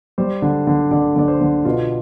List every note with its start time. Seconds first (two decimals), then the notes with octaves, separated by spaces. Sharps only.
0.18 G3 C5
0.42 D3
0.67 D3
0.91 D3 D5
1.16 D3 D5
1.28 C5
1.41 D3
1.65 B2 F4